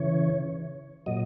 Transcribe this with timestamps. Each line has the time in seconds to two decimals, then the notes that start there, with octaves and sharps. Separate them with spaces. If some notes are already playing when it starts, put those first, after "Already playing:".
Already playing: C#3 E3 C#5
1.06 A#2 F#3 D#5